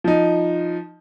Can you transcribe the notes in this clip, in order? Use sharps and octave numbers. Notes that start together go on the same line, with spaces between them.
F3 D#4